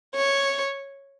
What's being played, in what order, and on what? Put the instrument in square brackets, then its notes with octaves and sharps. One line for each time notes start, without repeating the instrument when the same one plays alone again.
[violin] C#5